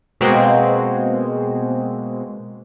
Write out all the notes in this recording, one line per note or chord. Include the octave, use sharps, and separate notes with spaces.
B2 G#3 A#3 C4 F#4